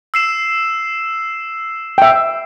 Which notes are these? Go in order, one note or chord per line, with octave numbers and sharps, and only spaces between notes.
E6 C7 E7
E5 G5